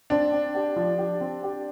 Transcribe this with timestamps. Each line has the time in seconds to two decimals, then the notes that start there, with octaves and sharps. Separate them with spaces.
0.10 C4 D4
0.32 C4
0.55 G4
0.76 F3
0.98 G4
1.21 C4
1.43 G4